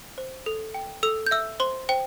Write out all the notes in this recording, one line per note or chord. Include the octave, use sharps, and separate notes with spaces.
C5
A4
G5
A4 E6
G6
E5 E6
C5 C6
C5 G5